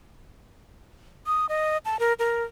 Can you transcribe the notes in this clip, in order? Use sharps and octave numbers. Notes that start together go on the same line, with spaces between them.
D#6
D#5
A5
A#4
A#4